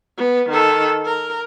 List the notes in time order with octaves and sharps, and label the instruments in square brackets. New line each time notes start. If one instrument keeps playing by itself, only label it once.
[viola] B3
D#3 A4
A#4